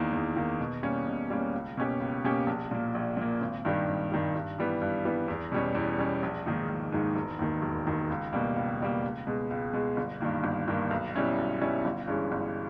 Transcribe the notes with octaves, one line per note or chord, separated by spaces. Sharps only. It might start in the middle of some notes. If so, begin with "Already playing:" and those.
Already playing: E2 D#3 A#3
E2
D#3 A#3
B2
G3 A#3 C#4
B2
G3 A#3 C#4
C#2
B2 A#3 C#4 G4
C#2
B2 A#3 C#4 G4
A#1
A#2 A#3
A#1
A#2 A#3
G#1
G2 D#3 G3
G#1
G2 D#3 G3
G2
E3 G3 B3
G2
E3 G3 B3
E2
B2 G3 C#4
E2
B2 G3 C#4
A#1
G#2 D#3 A#3 D#4
A#1
G#2 D#3 A#3 D#4
E1
D#2 D#3
E1
D#2 D#3
C#2
B2 G3 A#3
C#2
B2 G3 A#3
C#2
B2 G#3
C#2
B2 G#3
G1
G2 D#3 A#3
G1
G2 D#3 A#3
B1
B2 G3 C#4 E4
B1
B2 G3 C#4 E4
G1
G2 E3 G#3 C#4
G1